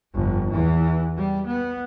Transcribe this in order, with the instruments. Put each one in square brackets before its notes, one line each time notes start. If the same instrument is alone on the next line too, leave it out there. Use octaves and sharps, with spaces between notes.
[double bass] G1 F2
E2 E3
G3
B3